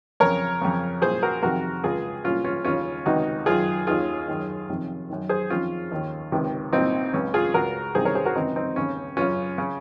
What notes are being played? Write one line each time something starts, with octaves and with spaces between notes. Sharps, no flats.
F2 C#3 A#4 C#5
F2 C#3
C2 A#2 G#4 C5
F#4 A#4
F2 C3 D#3 F#4 A#4
C#2 C#3 F4 G#4
C2 A#2 C#4 F4
C#4 F4
D#2 C#3 C#4 F4
C#2 C3 D#3 D#4 F#4
F#2 D#3 F4 G#4
D#2 D#3 F4 G#4
F#2 D#3
F2 C3 D#3
F#2 D#3
G#4 C5
F2 D#3 C#4 F4
D#2 D#3
C#2 C3 D#3
C2 A#2 C4 D#4
C#2 C#3 C#4
F4 G#4
C#2 C#3 F#4 A#4
C2 C3 D#3 G#4 C5
A#4 C#5
G#4 C5
F#4 A#4
C#2 C3 D#3 C4 D#4
C4 D#4
D#2 C#3 C#4
F#2 C#3 C#4 F4
C#3